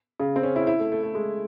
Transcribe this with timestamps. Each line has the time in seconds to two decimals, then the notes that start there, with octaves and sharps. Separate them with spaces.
0.20 C#3
0.36 C4
0.43 C#4
0.56 E4
0.67 E4
0.79 A3
0.92 A3
1.03 A3
1.15 G#3